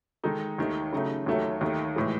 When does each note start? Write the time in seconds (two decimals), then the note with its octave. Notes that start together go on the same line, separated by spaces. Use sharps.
0.23 D#3 G#3 D#4 A4
0.58 D#2 D#3 A3
0.92 C#3 F#3 A3 D#4
1.26 D#2 D#3 F#3 A3
1.61 D#2 D#3 A3
1.96 A2 E3 G#3